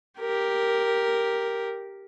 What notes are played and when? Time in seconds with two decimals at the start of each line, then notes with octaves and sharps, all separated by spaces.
0.20 G4 A#4